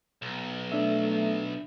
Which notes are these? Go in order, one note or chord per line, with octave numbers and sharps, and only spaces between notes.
B1
A3 D4 E5